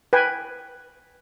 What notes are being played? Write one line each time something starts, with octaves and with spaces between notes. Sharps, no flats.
B4 G5 G#5